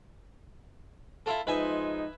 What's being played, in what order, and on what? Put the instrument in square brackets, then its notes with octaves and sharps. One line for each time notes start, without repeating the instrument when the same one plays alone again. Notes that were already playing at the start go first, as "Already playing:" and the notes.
[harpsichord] E4 F4 A4
[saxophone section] F3 G#3 D#4 [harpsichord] B4 E5 G#5